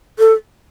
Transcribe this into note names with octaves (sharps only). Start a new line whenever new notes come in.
A4